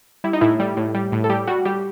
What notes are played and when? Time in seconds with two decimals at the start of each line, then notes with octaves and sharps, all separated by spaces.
0.24 G3 E4
0.33 D#4
0.41 A2 E4
0.60 G3
0.77 A2
0.95 G3
1.12 A2
1.24 A4
1.30 G3 G4
1.47 G3 F#4
1.65 G3 G4